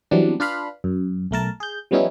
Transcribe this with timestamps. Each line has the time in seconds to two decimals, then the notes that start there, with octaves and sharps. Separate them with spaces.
0.11 E3 F#3 G3 B3 C4 D4
0.40 D4 F4 B4 F5 B5
0.84 F#2
1.31 B1 A3 A#4 A5
1.60 G#4 G6
1.91 F3 G3 B3 C#4 D#4 E4